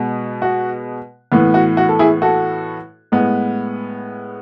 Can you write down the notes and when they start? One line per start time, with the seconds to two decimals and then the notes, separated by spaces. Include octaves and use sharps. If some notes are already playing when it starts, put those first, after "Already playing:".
Already playing: B2 G#3 B3
0.42 F#4
1.32 A2 E3 B3
1.54 F#4
1.77 F#4
1.89 A4
1.99 E4 G#4
2.22 F#4 A4
3.12 A2 G#3 B3